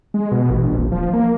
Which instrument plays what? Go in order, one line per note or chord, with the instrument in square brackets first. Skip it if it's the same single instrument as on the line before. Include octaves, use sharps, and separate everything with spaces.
[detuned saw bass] G#3
B2
A1
A#1
D#1
F3
A#3